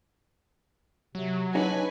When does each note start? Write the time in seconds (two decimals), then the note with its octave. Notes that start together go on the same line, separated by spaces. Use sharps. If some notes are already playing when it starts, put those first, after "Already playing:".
1.15 C3 F#3
1.55 D4 D#4 B4 C#5 G#5